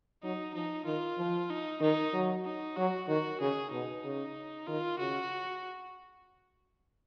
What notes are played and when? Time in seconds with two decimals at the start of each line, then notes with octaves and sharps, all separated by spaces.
0.23 F#3 D#4
0.55 F3 D#4
0.86 D#3 F4
1.18 F3
1.50 D#4
1.81 D#3 D#4
2.13 F#3
2.45 D#4
2.77 F#3 F#4
3.08 D#3 F#4
3.41 C#3 G#4
3.72 B2 D#4
4.04 C#3
4.67 D#3 F4
4.99 C#3 F#4